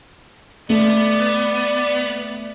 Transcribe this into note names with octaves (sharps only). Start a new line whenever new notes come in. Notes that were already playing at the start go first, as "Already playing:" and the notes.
A3 B3 D5